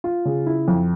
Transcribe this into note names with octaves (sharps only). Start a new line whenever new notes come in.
F4
C#3
E4
F2